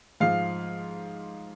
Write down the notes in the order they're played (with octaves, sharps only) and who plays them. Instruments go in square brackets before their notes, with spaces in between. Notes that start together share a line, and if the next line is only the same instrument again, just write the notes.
[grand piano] G#2 F3 F5